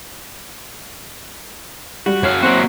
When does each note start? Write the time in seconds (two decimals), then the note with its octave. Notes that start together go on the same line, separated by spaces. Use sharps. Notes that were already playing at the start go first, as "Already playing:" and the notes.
2.06 G3 F#4
2.23 F#2 C#5 F5
2.43 F#3 A#3 C4 E4 F#4 F#5